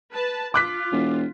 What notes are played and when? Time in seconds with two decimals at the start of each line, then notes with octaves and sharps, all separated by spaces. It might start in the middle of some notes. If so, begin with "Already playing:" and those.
0.11 B4 A5
0.54 F4 D6 F#6 B6
0.92 E1